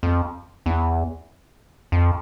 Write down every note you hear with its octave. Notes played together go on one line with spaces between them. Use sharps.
F2
E2
F2